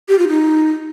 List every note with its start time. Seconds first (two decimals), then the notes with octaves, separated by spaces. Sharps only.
0.09 G4
0.19 F4
0.29 D#4